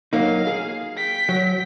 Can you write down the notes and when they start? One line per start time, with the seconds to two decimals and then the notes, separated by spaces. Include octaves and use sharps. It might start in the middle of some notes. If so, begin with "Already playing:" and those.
0.13 F#3 A#3 D#4 F5
0.47 G#4
0.97 G5 B6
1.29 F#3